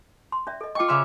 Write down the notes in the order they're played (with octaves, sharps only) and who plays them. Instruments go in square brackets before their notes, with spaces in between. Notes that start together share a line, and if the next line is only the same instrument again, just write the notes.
[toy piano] C6
C#4 D5 E5
A4 D#5
[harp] F4 C#6 [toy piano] D#5 G5 D6
[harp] C#3 E5 F6 [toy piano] C6 D6